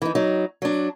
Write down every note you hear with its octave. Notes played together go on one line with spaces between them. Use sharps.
E3 D#4
F#3 D#4
F#3 D4